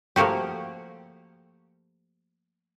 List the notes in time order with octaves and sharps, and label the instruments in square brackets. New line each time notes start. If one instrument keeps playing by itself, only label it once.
[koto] F3 A3 A#3 F#4 G4